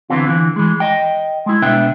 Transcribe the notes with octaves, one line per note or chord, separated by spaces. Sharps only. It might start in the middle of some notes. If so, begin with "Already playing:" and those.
D3 E3 B3 C4 F4
D3 E3
E3 G#3
D#5 G5
G#3 E4
C#2 B2 B3 D4 E5 G5